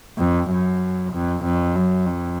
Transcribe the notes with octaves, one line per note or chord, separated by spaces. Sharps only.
F2
F#2
F2
F2
F#2
F2